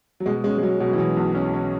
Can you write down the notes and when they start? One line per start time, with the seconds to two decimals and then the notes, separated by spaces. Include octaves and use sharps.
0.20 F#3
0.26 B2 G#3
0.44 G#3 C#4
0.58 G#3
0.62 F#3 C#4
0.80 B2 F#3
0.93 E3
0.98 B2 F#3
1.17 B1
1.35 C#4
1.53 C#4